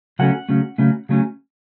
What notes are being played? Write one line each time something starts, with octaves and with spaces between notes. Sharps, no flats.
C#3 F#3 A3 C#4 F#5
C#3 F#3 A3 C#4
C#3 F#3 A3 C#4
C#3 F#3 A3 C#4